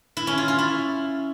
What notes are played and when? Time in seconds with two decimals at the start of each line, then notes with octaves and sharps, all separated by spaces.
0.17 E4
0.27 C#4
0.38 F4
0.48 F4
0.58 E4